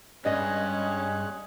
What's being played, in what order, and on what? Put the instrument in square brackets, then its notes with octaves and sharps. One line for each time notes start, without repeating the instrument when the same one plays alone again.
[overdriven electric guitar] G2 [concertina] G#3 G#4 F#6 [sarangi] C#4 [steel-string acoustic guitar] D5 D#5